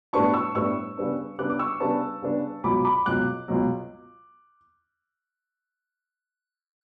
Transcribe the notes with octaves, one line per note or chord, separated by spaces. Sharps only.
A2 G3 B3 D4 A5 C#6
C#6 E6
A2 G3 B3 D4 C#6 E6
C#3 G3 B3 D4
C#3 G3 B3 D4 D6 F#6
D6
C#6 E6
C#3 G3 B3 D4 A5 C#6
C#3 G3 B3 D4
C#2 B2 F#3 B5 D6
B5 D6
C#2 B2 F#3 D6 F#6
C#2 B2 F#3